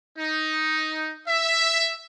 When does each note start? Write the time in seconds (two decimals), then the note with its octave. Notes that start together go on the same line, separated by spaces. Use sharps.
0.17 D#4
1.27 E5